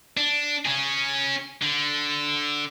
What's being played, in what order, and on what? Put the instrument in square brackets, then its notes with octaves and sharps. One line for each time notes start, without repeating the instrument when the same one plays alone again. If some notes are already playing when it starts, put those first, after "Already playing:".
[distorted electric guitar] D4
C#4 G#4
D3